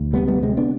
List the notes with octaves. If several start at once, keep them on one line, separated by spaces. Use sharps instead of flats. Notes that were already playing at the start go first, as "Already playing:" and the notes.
Already playing: D2
C3 G3 B3
G3 B3
C3 G#3 C4
B3 D4